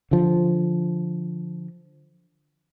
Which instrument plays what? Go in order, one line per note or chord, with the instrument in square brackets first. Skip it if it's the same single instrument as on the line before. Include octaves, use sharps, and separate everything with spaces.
[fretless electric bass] D3 F3